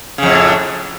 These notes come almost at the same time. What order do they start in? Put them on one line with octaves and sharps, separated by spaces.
C#3 F2 A2